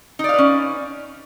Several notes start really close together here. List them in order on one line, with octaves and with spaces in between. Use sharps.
D#4 D5 F5 B4 C#4